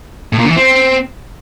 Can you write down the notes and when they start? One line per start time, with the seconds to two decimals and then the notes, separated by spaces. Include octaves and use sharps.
0.33 A2
0.39 A#2
0.45 D3
0.51 E3
0.56 C4